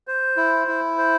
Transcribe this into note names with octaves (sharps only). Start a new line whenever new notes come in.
C5
E4
E4
C5